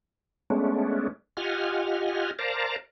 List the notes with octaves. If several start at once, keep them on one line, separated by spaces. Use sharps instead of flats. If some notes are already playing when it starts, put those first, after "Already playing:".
G#3 A3 B3 C#4 D4
F4 G4 D#5 F#5 G#5 F6
A#4 C5 D5 F5 A5 A#5